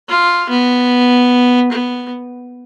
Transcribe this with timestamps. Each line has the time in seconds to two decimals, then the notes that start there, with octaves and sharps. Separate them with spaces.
0.09 F4
0.49 B3
1.72 B3